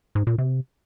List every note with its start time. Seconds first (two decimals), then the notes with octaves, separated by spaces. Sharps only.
0.15 G#2
0.27 A#2
0.38 C3